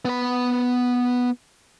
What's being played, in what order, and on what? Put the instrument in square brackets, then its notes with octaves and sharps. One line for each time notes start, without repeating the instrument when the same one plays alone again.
[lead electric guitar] B3 B5